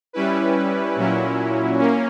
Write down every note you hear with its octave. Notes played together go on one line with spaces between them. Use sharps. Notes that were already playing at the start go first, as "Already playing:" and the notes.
G3 C#4 E4 B4
A#2 F#3 C#4 E4
A#3 C#4